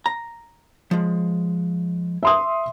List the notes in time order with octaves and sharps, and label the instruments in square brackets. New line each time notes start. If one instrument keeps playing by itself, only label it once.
[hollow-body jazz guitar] A#5
F3 G#3
[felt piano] E5 C6 D#6